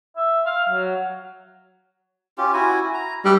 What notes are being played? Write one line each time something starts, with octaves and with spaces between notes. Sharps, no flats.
E5
F5
F#3
C#4 F4 G4
E4 F#4 G#5
A#5
G3 A3 A4 B4